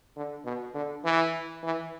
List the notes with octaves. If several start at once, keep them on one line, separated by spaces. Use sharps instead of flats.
D3
B2
D3
E3
E3